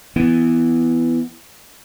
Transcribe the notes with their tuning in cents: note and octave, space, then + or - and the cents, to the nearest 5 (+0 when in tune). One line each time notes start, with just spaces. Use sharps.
E3 +5 B3 +10